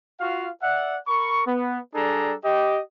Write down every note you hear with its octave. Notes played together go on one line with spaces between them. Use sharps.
F4 F#4 F5
D5 E5 F#5
A#4 B5 C#6
B3
G3 D4 G#4 A4 A#5
G4 D#5